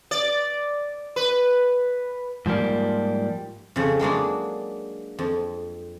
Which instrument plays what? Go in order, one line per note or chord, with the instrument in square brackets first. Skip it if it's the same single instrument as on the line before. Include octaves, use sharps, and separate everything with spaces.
[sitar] D5
B4
[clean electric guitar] G#2 F3 G3 A#3
[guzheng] F2 C#3
F#3 G#3 A#3 D4
F2